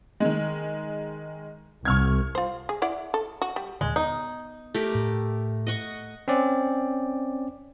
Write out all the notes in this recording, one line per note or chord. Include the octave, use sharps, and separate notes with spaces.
D#3 G#3
C2 C#6 F6 G#6
F4 C5
G#4
E4 D5 F#5
A4
F#4
G3
D#2 A#2 D3 G#3
B3 D#4
A3 G4 A#4
A2
D#5 F#5 C#6
C4 C#4 D5